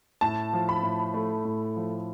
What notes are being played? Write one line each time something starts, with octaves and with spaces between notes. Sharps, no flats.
A2 A5
F3
B5
A2
A3
A2
F3